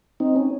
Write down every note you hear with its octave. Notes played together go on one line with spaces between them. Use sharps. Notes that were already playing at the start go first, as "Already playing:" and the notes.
C4 D#4
C#4